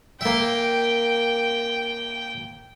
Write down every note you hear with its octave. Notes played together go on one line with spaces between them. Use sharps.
A#3 E5 G5